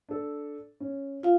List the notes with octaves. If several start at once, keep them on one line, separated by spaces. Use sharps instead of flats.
D4 A4
C#4
F4 F5